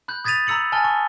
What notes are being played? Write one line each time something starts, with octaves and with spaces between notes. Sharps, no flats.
B5 F#6 G6
D#6 G#6 A6 B6 D#7 F7
A#5 B5 E6 C#7 F#7
G#5 A5 F6 A6 G7
C#6